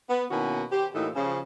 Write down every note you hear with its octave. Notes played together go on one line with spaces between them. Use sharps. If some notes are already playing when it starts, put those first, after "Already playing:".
B3
B2 D#3 A#3 C#4 E4 F#4
G4 C5
A2 E3 A#3 D#4 F4 A4
C#3 F3